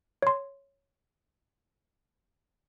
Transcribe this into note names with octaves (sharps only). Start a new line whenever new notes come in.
C#5 C6